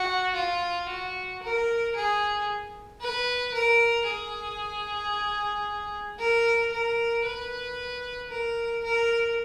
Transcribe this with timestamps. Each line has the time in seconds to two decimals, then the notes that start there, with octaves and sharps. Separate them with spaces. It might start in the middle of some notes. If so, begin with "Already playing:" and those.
Already playing: F#4
0.36 F4
0.89 F#4
1.43 A#4
1.96 G#4
3.01 B4
3.54 A#4
4.07 G#4
6.19 A#4
6.72 A#4
7.25 B4
8.30 A#4
8.84 A#4